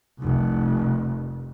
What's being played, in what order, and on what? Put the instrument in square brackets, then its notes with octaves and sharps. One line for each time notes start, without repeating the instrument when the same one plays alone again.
[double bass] F1 C2